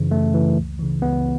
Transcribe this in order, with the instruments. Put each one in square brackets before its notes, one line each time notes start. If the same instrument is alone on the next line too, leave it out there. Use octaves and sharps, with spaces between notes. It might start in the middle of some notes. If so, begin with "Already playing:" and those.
Already playing: [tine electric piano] F#2 C#3 E3
F#2 A3
C#3 E3
C#2
C#3 E3
C#2 B3